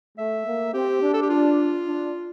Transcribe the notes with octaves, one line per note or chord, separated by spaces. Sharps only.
A3 E5
A#3
C4 G4
D4
A4
G4
F4
D4